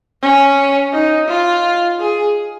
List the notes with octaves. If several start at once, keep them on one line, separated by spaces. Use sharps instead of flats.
C#4
D#4
F4
G#4